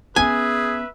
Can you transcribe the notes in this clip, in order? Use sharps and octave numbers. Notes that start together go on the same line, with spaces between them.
B3 C#4 G#4 B4 E5 G#5